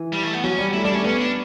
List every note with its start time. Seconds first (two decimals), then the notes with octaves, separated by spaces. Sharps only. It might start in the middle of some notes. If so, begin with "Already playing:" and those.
Already playing: E3
0.13 G3
0.23 A3
0.33 B3
0.43 F#3 C#4
0.59 G3
0.73 A3 E4
0.85 G3 D4
0.94 A3 C#4
1.05 B3 C#4
1.20 D4